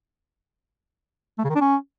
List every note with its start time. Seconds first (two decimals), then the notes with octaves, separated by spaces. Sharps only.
1.39 A3
1.44 C#3
1.50 D#3
1.55 D4
1.61 C#4